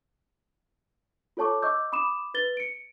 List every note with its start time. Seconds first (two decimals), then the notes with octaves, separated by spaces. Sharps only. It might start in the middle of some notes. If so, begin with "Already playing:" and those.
1.37 F4 A4 C#5 A5 C#6 D6
1.62 D#5 C#6 D6 E6 G6
1.92 B5 D6 D#6 E7
2.34 B4 A6 G7
2.57 C#7 D7